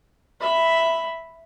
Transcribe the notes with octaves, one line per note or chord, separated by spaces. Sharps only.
E5 B5